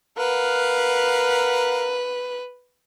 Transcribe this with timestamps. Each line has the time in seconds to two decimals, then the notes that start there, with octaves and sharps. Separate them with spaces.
0.18 A#4 B4 F5 F#5